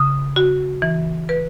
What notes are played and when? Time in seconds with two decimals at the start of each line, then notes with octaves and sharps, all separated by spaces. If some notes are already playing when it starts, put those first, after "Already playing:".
Already playing: C#3 D#6
0.36 F#4
0.82 E3
1.29 B4